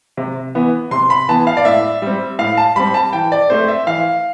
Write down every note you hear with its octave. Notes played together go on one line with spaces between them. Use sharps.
C3
E3 B3
C3 C6
B5
E3 B3 A5
F5
D5
A2 E5
G3 C4
A2 F5
A5
G3 C4 B5
A5
E3 G5
D5
A3 C4 C5
E5
E3 F5